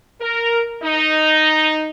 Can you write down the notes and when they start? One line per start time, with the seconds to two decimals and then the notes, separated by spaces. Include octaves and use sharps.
0.21 A#4
0.82 D#4